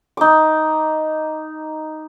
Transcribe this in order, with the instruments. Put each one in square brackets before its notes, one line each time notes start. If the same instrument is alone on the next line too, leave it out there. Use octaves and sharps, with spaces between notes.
[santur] D#4 D6